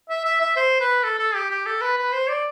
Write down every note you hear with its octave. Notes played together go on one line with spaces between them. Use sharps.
E5
E5
E5
C5
B4
A4
A4
G4
G4
A4
B4
B4
C5
D5